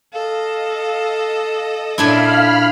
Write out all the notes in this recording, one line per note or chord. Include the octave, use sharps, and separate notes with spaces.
A4 D#5 F5
A#2 D4 E4 F5 B5 F6 G#6